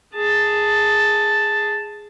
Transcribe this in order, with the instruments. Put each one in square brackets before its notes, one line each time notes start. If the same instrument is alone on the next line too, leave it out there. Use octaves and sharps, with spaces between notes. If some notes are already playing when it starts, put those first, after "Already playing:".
[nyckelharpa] G#4 A5